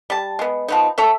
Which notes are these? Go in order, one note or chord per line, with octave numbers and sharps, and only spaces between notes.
G3 A5
G#3 B3
F3 B3 D#4
A4 C#5 E5